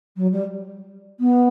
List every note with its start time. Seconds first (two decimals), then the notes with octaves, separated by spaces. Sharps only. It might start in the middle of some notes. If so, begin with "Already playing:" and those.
0.16 F#3
0.32 G3
1.20 B3